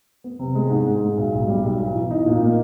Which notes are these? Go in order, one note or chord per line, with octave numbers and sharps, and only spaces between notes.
B3
C3
G#3
G#2
G#2
G#3
B1
B1
G3
B1
B1
E3
D#4
A#2
A#3